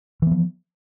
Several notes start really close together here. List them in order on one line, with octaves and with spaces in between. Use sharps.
E3 B3 F3